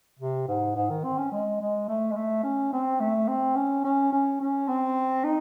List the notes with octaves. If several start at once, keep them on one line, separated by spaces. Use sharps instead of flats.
C3
G#2
G#2
D#3
C4
C#4
G#3
G#3
A3
G#3
A3
C#4
C4
A3
C4
C#4
C#4
C#4
C#4
C4
D#4